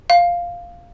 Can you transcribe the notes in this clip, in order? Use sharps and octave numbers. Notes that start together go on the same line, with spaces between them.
F5